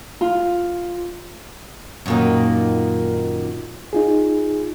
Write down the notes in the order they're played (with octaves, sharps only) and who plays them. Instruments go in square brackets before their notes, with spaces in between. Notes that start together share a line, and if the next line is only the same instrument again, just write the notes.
[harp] F4
[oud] F#2 A#2 D#3
[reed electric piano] D#4 F4 G#4